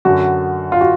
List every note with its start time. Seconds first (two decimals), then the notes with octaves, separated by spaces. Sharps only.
0.05 F#2 D3 F#4
0.72 F4
0.81 F#4